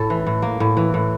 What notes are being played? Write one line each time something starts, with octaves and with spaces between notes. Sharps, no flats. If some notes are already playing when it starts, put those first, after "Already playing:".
Already playing: A2 A4
E3
A2
A#3
A2
E3
A2